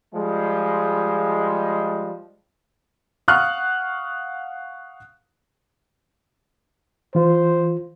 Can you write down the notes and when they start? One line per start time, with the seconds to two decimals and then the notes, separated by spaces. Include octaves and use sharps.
0.14 F3 G3 G#3
3.28 F5 F#5 C#6 D#6 F6 F#6
7.15 E3 F4 C5